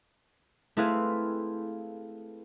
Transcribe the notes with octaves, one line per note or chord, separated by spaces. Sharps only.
A3 C4 E4 G#4 B4 F5